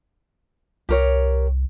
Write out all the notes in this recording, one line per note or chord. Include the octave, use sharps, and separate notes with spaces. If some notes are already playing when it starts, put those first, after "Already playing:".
C2 G4 A#4 C#5